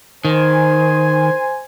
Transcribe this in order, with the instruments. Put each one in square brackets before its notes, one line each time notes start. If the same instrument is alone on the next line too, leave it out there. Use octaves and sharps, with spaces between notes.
[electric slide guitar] D#3 [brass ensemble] C5 G#5